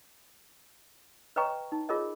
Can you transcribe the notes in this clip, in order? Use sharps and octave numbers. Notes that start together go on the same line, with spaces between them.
B4 C#5 D#5 G5 A#5 C#6
D#4
F4 G#4 A#4 C#5 D#5